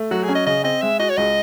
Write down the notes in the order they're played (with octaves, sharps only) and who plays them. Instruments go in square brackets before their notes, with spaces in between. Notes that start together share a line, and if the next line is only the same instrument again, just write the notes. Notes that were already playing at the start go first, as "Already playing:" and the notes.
Already playing: [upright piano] A3
[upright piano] F#3 [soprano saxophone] F#4
[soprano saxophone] G#4
[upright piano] C#4
[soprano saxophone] D#5
[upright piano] C#3 [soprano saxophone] D#5
[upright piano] C4 [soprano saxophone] D#5
[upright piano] G#3 [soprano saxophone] E5
[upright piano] F#4 [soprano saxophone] D#5
[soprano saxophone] C#5
[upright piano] C#2 [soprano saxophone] D#5